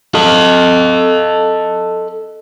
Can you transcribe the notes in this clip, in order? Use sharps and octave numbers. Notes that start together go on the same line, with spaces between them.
A4 D#5